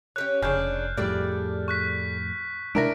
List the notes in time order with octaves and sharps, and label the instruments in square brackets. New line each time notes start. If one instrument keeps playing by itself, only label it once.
[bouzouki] C#4 G4 C#5 [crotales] F#6
[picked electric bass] F1 [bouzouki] C#3 D4 [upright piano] G#4 C#5 [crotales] F6 G6
[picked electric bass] F2 A2 [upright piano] G3 [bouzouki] G#4 A4 D5
[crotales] C#6 F#6 B6
[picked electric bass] C3 G#3 [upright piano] D4 E4 A#4 [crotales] A#6 D7